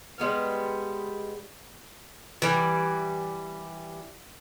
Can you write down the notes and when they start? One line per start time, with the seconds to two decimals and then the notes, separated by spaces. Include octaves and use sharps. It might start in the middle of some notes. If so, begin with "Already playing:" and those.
0.18 G3 G#3 B3 F5
2.42 E3 G3